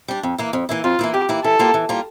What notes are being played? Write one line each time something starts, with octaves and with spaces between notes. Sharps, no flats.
G3 D4
F2
E3 A#3 E4
F2
E3 A#3 E4
F2 F4
E3 A#3 E4
F2 G4
E3 A#3 E4
E3 A4
G3 A#3 F4
E3
G3 A#3 F4